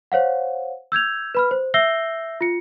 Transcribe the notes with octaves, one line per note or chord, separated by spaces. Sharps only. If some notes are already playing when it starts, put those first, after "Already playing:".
C5 C#5 F5 F#5
E6 G6 G#6 F7
B4 B5 F6
C5
E5 E6 G6 A#6 C7 G7
F4 C#7